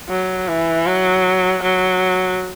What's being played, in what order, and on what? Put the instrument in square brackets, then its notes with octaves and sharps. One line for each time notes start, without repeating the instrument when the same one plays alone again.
[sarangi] F#3
E3
F#3
F#3